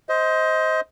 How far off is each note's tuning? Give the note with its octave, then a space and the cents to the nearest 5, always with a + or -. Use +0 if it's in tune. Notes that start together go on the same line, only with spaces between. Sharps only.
C5 +0 D#5 +25